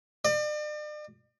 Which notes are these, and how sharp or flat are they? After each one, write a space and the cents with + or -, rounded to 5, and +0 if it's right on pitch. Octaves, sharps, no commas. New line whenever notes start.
D5 +40